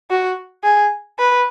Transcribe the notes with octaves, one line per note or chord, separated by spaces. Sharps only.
F#4
G#4
B4